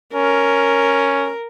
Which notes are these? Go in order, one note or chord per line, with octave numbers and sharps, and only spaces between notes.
C#4 A#4